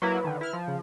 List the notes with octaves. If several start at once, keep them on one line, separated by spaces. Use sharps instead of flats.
F#3 A#3 E4 B4
D3 D#3
E4 F6
F3
C#3